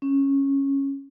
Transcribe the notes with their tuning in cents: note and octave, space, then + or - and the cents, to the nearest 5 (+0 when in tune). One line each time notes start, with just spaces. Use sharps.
C#4 -10